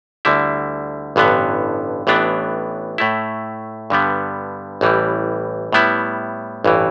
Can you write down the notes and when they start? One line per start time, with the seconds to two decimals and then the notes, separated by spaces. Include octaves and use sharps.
0.25 D2 D3 G3 E4
1.16 A1 G2 D3 B3
2.07 A1 A2 E3 B3 D4
2.98 A2 A3 E4
3.90 G2 D3 G3 B3
4.81 A1 A2 E3 G3
5.73 A2 G3 B3 E4
6.64 A1 G2 E3